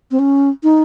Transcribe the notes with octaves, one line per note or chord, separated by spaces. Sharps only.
C4
C#4
D#4